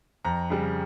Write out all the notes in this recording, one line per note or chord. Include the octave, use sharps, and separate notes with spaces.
F2 A#5
C#3 G3